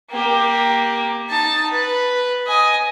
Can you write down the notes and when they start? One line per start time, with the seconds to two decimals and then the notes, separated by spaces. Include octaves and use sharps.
0.11 A#3 G4
1.29 D#4 A5
1.71 B4
2.47 D#5 G#5